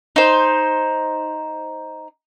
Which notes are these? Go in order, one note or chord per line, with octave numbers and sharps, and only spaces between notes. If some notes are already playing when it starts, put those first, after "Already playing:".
D#4 C5